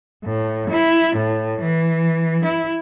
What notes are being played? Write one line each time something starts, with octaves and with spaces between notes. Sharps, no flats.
A2
E4
A2
E3
E4